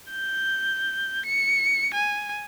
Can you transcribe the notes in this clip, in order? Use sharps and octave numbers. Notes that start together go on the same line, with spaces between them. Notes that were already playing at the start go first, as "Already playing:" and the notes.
G6
C#7
G#5